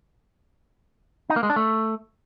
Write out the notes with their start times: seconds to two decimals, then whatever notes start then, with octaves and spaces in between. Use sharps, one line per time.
1.30 D#4
1.36 A#3
1.43 G#3
1.50 D4
1.56 A3